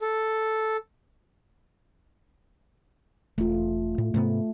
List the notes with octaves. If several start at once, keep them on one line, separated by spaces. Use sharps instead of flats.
A4
E1 A3 F4
A2
G#2 C3 A3 B3